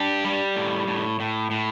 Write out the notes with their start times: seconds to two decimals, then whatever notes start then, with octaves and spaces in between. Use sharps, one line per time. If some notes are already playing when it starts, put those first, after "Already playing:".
Already playing: D4 G4
0.25 G3
0.56 A2
0.87 A2
1.20 A2
1.51 A2